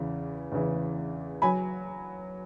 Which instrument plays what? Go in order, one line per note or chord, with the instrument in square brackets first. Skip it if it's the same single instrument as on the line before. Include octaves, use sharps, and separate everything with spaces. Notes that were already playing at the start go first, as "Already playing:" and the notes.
Already playing: [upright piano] E2 C#3 E3
E2 C#3 E3
F#3 G#5 B5